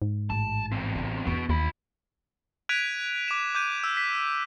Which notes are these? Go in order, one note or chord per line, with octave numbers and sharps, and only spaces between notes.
G#2
A1 A5
E2 C4
A1 D3
E2 B3 D4 F#4
D#2 F4 B5
F#6 G#6 B6 D7 D#7 F7
D6 E7
D6 G6 D#7
E6
B6